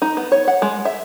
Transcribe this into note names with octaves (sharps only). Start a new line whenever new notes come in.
D#4
B3
C#5
F#5
G#3
E5